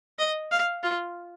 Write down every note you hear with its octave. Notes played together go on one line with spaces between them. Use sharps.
D#5
F5
F4